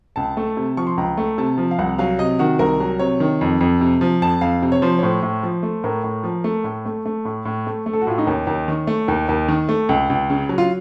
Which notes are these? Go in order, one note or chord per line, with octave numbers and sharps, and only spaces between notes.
C#2 A5
A3
C3
F3 C#6
C6
C#2 A#5
A3
C3 A5
F3
F5
C2 F#5
F#3 F5
C3 D#5
D#3 F#4
C2 A#4
F#3
C3 C#5
D#3
F2
F2
C3
F3
F2 A5
F2 F5
C3
C#5
F3 C5
C#5
A2 C5
A2
F3
A3
A2 A#4
A2
F3
A3
A2
A3
A3
A2
A2
A3
A3
A4
F#4
A2 F4
D#4
D#2 C#4
D#2
D#3
A3
D#2
D#2
D#3
A3
C#2
C#2
C#3
F#3
F4